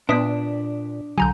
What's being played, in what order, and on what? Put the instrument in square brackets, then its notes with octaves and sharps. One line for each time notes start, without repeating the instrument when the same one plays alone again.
[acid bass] A#2 [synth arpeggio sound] B3 B4 [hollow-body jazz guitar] D4 [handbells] E5 D#6 B6
[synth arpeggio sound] B1 F#3 [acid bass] D3 [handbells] G#5 A#5 G6